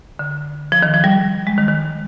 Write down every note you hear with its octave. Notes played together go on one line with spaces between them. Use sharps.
D3
F3
D#3
F3
G3
G#3
D#3
D#3